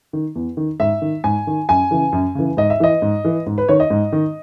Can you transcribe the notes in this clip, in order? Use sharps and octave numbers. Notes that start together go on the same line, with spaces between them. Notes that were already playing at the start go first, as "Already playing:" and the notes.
D#3
E2
D#3
G#2 E5
D#3
G#2 G#5
D#3
F#2 G#5
C#3 E3
F#2
C#3 E3
G#2 D#5
E5
E3 D#5
G#2
E3
G#2
B4
D#3 C#5
D#5
G#2
D#3